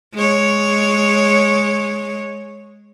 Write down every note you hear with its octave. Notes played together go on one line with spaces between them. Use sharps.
G#3 C#5